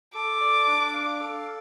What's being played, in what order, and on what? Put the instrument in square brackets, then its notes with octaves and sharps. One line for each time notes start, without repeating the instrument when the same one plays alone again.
[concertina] A4 [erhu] D6
[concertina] D5
D4
F5
A4